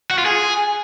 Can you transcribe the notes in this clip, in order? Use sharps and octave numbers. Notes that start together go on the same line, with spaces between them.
F#4
F4
G#4